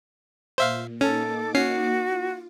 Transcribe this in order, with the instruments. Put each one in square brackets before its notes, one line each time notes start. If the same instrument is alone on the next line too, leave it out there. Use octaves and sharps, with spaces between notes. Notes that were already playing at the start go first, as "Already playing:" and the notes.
[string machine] A#2 [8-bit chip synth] C5 E5 F5
[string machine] A#3 D#4 D6 [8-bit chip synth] C#4 [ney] A4
[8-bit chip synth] C#4 C7 [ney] F#4
[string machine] F4